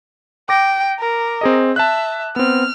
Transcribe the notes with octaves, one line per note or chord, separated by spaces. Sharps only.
G5 D6 A#6
A#4
C4 G#4 D#5
E5 A5 F#6
B3 C4 F6